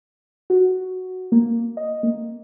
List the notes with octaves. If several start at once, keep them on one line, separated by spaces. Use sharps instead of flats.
F#4
A#3
D#5
A#3